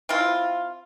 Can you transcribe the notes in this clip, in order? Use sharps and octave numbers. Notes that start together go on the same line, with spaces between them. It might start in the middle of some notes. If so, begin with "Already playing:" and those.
C4 E4 F4